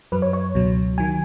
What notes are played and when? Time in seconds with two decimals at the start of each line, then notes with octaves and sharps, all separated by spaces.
0.12 F#2 F#3 B4
0.22 C#5
0.33 C#5
0.54 C#2 B2 F#3
0.98 D#3 F#3 G#5